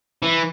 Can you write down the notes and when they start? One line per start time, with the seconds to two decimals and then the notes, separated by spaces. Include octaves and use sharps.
0.23 E3